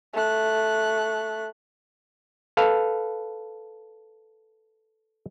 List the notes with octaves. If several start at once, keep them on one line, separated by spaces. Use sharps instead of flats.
A3 F#6
A4 B4 F5